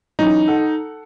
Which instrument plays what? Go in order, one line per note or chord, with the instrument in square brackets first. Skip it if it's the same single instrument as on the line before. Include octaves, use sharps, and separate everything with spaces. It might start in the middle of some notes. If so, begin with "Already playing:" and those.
[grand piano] E3 F#3 C#4 [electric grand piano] D#4
[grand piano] A4 F#5